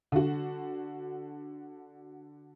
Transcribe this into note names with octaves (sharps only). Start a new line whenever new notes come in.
D3 F#4